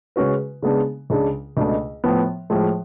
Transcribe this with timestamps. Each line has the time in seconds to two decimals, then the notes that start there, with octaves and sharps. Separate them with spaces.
0.16 C#3 G#3 C#4 F#4 B4
0.62 C#3 G#3 B3 D4
1.10 C#2 C#3 G#3 D4
1.57 C#2 B2 A3 D4
2.04 A2 F3 B3
2.50 A2 F3 G#3